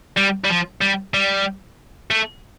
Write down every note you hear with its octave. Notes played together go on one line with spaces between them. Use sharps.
G3
G3
F3
G3
G3
A3